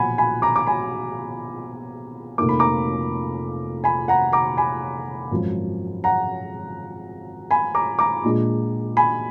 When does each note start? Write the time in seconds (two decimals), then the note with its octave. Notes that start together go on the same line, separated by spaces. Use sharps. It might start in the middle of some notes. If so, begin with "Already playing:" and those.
Already playing: B1 A#2 F3 B3 F#5 G#5 B5
0.18 G#5 B5
0.42 A#5 D6
0.56 D6
0.67 G#5 B5
2.38 F1 F2 D#3 A#3 D6
2.49 B5
2.59 A#5 D6
3.84 G#5 B5
4.08 F#5 A#5
4.33 A#5 D6
4.57 G#5 B5
5.31 G#1 F#2 F3
6.04 F#5 A#5
7.51 G#5 B5
7.75 A#5 D6
7.99 A#5 D6
8.23 A#1 A#2 G#3 D4
8.97 G#5 B5